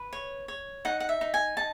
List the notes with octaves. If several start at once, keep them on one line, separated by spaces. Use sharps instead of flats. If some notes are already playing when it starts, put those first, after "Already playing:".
Already playing: B4
C#5
C#5
D#4 F#5
F#5
E5
D#4
G#5
D#4 A5